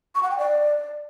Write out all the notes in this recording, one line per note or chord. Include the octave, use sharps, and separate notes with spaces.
C#6
F#5
G5
D5